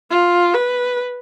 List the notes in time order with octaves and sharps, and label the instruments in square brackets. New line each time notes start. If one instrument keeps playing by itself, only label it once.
[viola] F4
B4